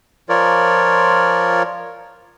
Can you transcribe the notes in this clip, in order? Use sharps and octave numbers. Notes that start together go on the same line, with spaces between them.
F3 F4 A#4 C#5 D5